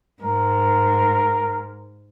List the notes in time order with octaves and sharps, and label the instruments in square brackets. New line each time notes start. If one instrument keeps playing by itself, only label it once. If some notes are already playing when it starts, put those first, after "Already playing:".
[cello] G#2 [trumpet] A#4